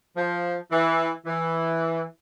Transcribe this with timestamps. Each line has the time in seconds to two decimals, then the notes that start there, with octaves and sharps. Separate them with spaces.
0.17 F3
0.71 E3
1.26 E3